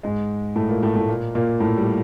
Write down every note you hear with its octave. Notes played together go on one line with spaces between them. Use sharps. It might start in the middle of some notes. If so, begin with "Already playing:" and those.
G#2 G#3
A2 A3
A#2 A#3
A2 A3
A2 A3
A#2 A#3
A#2 A#3
A2 A3
G3